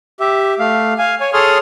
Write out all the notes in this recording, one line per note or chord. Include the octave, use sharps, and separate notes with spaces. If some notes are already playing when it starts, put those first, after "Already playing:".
G4 E5
A3 F5
F5 G#5
C#5 G#5
G#4 A4 C#5 C6 D#6 F6